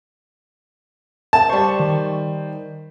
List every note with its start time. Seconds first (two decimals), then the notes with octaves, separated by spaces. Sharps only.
1.33 A5
1.49 G3 C5 C#6
1.80 D#3